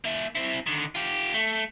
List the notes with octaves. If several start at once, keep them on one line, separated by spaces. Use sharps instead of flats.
A#3 E5
C4 E4
D3 D#3
F4 G4
A3